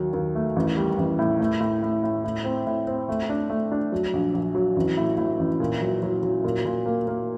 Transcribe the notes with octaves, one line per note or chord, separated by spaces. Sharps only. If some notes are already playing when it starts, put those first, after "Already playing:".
Already playing: D#2 F#3
D#2
A3
A1
G3
A1
A2
A3
A2
A2
A2
A2
C4
A2
C4
A3
D4
A3
D4
F#3
A#1
A#1
F#3
A1
A2
A2
A1
A#2
F#3
F#3
F#3
A#2
A#2
A#3
A#3